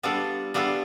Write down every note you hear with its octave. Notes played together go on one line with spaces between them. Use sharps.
G3 B3 D4 F4 A4
G3 B3 D4 F4 A4